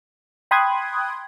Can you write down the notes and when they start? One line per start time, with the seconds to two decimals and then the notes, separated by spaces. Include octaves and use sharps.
0.51 G5 B5 C6 D#6 F#6 G#6